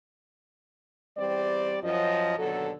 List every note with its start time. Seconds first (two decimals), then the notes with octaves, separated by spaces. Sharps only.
1.17 E2 G3 C4 D5
1.83 F#2 F3 D#5
2.38 D#2 B2 D3 F#3 A4